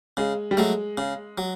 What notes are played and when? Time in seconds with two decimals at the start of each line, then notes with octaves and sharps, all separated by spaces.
0.17 C#3 G#3
0.51 G3
0.57 F#3 G#3 A3
0.98 C#3
1.38 F#3